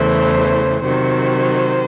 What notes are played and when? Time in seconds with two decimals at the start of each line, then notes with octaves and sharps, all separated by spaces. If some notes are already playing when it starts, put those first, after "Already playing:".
Already playing: E2 C#3 E3 A3 C5
0.82 C3 D#3 F#3 C5